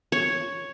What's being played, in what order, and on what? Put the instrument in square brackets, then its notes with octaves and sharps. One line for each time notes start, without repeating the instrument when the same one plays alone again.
[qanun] C#5